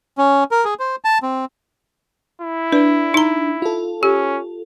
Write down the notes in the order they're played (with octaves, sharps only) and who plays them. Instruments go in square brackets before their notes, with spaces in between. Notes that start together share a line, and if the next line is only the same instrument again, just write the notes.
[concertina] C#4
A#4
G#4
C5
A5
C4
[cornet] E4
[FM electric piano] D4 [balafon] B4
[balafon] D#4 A#5
[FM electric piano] F4 A4
[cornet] C#4 [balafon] G4